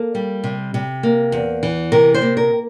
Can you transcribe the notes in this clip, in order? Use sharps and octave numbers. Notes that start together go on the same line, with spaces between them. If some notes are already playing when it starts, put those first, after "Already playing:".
Already playing: A#3 A4
G3
C3
C3
A#3
E2
E3
C3 A#4
C5
A#3
A#4